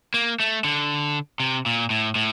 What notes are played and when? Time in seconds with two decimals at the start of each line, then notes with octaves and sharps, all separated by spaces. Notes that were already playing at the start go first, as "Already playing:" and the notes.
0.14 A#3
0.40 A3
0.64 D3
1.40 C3
1.66 A#2
1.90 A2
2.16 A2